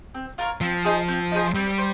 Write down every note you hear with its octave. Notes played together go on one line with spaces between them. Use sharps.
C4
F4 A#4 C#5
F3 C4
D#4 G#4 C5
C4
D#4 G#4 C5
G3 C4
C5